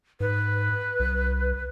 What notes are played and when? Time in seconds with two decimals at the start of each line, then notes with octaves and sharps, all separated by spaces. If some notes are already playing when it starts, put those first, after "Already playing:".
0.20 G#2 B4
1.00 C2